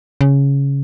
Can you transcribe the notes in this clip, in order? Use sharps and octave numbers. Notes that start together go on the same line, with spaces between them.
C#3